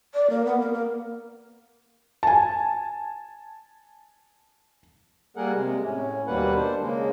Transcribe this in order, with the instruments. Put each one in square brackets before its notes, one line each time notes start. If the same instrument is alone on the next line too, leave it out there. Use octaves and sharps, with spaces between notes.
[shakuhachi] D5
A#3
B3
A#4
A#3
[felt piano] G#5 A5
[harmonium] G3 A#3 G#4 A#4 F#5
C3 G#3
A2 C#4
D#2 B2 G3 A#3 B4 F#5
D4 C5
C#3 G#3 A#3